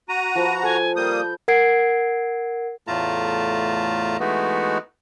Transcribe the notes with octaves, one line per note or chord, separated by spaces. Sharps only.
F#4 A#5 D#7
F3 B4
A4 G#5
G3 A#3 D#6 G6
A#4 F#5 G#6 C7 D7
E2 A2 A3 F4 A5 A#5
E3 G#3 A3 B3 D#4 F#4